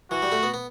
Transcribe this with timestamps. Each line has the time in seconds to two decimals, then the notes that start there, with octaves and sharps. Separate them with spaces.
0.11 E3 F#4
0.22 G3
0.32 A3
0.43 B3
0.54 B3